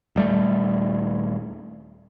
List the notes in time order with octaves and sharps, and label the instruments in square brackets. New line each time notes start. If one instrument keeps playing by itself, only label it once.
[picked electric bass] D#1 G3 A3